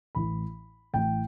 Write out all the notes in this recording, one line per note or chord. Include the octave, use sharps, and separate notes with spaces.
A1 A2 E3 B5
A1 A2 E3 G5